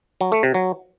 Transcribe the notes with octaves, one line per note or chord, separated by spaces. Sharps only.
F#3
A3
C3
F#3